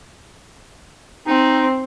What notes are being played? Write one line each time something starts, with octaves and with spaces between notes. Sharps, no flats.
C4 D#4